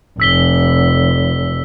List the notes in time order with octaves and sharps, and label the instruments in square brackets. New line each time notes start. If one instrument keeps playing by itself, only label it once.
[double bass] F1 [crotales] E6 B6 G7